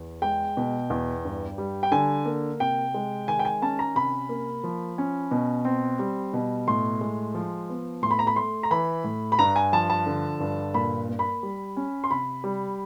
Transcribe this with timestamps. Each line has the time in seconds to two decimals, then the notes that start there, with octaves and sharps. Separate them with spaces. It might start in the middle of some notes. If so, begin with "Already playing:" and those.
Already playing: E2
0.22 G#3 G5
0.57 B2
0.90 E2
1.25 G2
1.58 G3
1.83 G5
1.92 D3 G#5
2.26 A#3
2.60 C3 G5
2.94 G#3
3.28 D#3 G#5
3.39 G5
3.45 G#5
3.62 C#4 A5
3.79 A#5
3.95 C3 B5
4.29 A#3
4.64 F3
4.98 C#4
5.31 B2
5.65 C4
5.99 G3
6.33 B2
6.68 A2 C6
7.01 G#3
7.35 F3
7.69 B3
8.02 A2 C6
8.11 B5
8.19 A#5
8.27 B5
8.36 A3 C6
8.63 A#5
8.71 E3 B5
9.04 A2
9.32 B5
9.39 G2 A#5
9.56 G#5
9.73 F3 A5
9.90 A5
10.06 D3
10.40 G2
10.74 A#2 B5
11.08 A#3
11.19 B5
11.43 G3
11.77 C#4
12.04 C6
12.11 C3 B5
12.44 G3